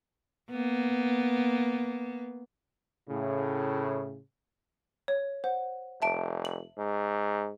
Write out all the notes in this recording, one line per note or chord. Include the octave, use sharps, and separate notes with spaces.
A#3 B3
A2 C#3
C#5
C5 F#5
F1 E5 A5 D7
F#7
G#2